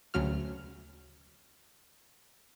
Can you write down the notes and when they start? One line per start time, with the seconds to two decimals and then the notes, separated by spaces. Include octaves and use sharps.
0.14 D2 C#3 F#3 F6